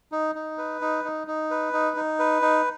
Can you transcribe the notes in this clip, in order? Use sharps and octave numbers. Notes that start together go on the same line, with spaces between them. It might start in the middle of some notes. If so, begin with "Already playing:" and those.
D#4
D#4
B4
D#4
D#4
D#4
B4
D#4
D#4
B4
D#4